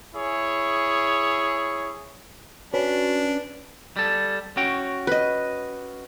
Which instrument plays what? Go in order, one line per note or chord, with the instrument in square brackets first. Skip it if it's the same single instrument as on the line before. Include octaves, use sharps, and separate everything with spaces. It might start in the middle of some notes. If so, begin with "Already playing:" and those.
[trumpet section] E4 G#4 C#5
[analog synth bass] C#4 [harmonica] D4 [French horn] F#4 [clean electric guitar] B4
[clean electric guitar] G3 A4
C#4 F#4 G5
[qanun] B4 D#5